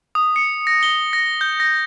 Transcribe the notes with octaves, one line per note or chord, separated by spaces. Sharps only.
D#6
C#7
A#6
G7
A#6
G6
A#6